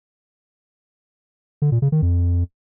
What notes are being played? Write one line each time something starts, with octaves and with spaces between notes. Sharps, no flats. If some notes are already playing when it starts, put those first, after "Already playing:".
D3
A#2
C#3
D#3
F2